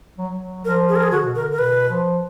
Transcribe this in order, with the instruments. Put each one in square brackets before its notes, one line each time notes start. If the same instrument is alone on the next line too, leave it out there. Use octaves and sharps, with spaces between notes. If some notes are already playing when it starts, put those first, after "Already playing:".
[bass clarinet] F#3
F#3
[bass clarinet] F3 [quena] A#4
[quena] G#4
A#4
G#4
[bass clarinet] D3 [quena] F#4
[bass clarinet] B2
[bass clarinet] D3 [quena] A#4
[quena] A#4
[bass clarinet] B2 [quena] B4
[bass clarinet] F3